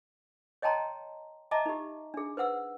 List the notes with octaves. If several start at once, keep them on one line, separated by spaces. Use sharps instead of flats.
C#5 D#5 G5 A5 A#5 C6
D#5 E5 A5 A#5 D6
D#4 G4
D4 G#4
B4 C5 F#5 E6